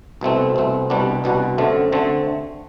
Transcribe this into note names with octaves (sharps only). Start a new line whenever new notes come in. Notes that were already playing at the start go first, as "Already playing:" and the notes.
C2 B2 A3 C4
C2 B2 A3 C4
C2 B2 G3 D4 F#4
C2 B2 G3 D4 F#4
F#2 D3 A3 C4
D3 A3 C4